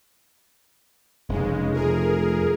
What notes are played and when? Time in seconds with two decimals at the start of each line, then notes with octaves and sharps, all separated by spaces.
1.29 F1 C#3 G#3
1.73 F3 A3 G#4 A#4